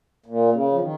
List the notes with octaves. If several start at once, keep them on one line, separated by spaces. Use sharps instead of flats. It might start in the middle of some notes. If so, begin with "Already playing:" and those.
A#2
C#3
F3
D#3